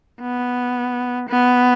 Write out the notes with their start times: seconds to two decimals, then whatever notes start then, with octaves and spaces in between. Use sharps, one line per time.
0.21 B3
1.29 B3